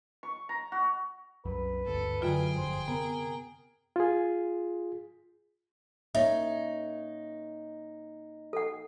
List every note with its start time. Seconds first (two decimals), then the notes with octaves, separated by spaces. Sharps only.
0.23 C#6
0.49 A#5
0.72 F#4
1.45 C2 F#2 F#3 B4
1.86 G#1 D2 G2 A4
2.22 F#2 D3 E3 F#3 F4 G#4 G5
2.57 G1 F2 C5
2.88 C3 B3 A#4
3.96 F4 G#4
6.15 A#3 D#4 C#5 E5
8.53 A4 F#5